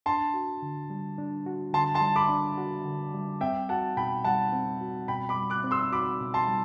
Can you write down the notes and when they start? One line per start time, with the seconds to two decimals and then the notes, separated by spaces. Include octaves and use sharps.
0.06 D4 A5 C6
0.34 F#4
0.62 D3
0.90 G3
1.18 D4
1.46 F#4
1.73 D3 A5 C6
1.94 A5 C6
2.02 G3
2.16 B5 D6
2.29 D4
2.58 F#4
2.85 D3
3.14 G3
3.41 C4 E5 G5
3.69 F#4 F#5 A5
3.97 B2 G5 B5
4.24 G3 F#5 A5
4.53 C4
4.81 F#4
5.08 B2 G5 B5
5.29 B5 D6
5.36 G3
5.50 D6 F#6
5.64 C4
5.71 C6 E6
5.92 F#4 B5 D6
6.20 B2
6.34 A5 C6
6.48 G3